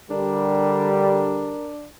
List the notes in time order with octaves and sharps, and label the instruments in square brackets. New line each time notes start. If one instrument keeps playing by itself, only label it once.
[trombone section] D3 G3 [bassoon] D4 [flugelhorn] A#4